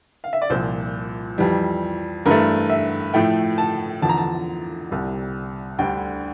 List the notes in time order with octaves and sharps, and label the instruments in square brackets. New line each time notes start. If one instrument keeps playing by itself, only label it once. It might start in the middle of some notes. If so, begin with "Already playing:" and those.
[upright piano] F5
E5
D5
C2 A#2 F3 C5
F2 E3 G3
G2 E3 A3 A#4
E5
A2 F3 A3 G5
A5
E2 D3 F3 A5
A#5
A5
C2 C3 G3
D2 D3 G3 G5